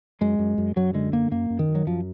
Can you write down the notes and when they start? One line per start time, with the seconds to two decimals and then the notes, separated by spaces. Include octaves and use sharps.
0.21 F#2 G#3
0.39 F#2
0.58 F#2
0.76 F#2 F#3
0.94 D3 G#3
1.13 F#2 A#3
1.31 F#2 A#3
1.50 F#2
1.59 D#3
1.68 F#2
1.75 F#3
1.87 F#2 F3